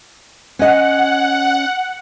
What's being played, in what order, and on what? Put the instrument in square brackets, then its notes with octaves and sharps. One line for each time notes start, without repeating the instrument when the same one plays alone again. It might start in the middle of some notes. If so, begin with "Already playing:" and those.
[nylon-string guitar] C#4 D#5 [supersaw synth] F#5